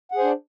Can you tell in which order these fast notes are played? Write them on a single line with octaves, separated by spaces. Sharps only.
F#5 G#4 C5 D4